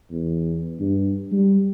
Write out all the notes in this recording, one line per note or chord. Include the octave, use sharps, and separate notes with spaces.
E2
G2
G3